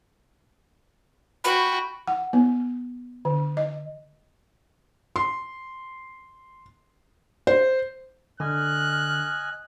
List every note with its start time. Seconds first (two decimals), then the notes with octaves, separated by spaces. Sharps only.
1.44 F#4 G5 B5
2.07 F#5
2.33 B3
3.25 D3
3.57 D#5
5.16 C6
7.47 C5
8.40 D3 D#5 G#5 F6 F#6